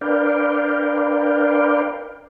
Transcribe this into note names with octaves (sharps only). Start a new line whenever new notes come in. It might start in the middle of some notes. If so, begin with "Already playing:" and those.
D4 A#4 B4 D5 F5 G5